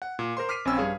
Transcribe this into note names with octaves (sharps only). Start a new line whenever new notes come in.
F#5
A#2
A#4 C5 C6
D6 F6 B6 C7 D#7
A#1 C4 C#4 G#5 B5 E6
G2 G#4 C#5 F5